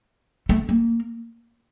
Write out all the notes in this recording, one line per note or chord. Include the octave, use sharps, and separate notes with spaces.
A3
A#3